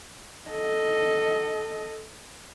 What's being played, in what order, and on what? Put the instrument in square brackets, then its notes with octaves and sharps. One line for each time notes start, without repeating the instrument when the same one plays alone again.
[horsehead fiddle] A4 D#5